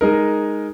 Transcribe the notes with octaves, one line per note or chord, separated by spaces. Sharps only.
G#3 D#4 A#4